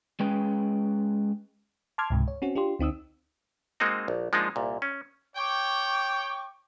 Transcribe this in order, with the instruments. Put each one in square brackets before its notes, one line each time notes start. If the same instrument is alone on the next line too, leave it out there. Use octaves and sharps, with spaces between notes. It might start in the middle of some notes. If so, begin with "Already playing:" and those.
[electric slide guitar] G#3 C#4 G#4 B4 G5
[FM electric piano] A5 C6 D6 F6 G#6
C#2 G#2 C3
C#5
C4 C#4 F#4
D4 F4 G4 C6
D2 C4 D#4 D#6 E6
[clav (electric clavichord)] G#3 A#3 C4 D#4 F#4
A#1
F3 G#3 A#3 D4 D#4
C2 A#2
C#4
[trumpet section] C#5 G5 [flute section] C#6 D6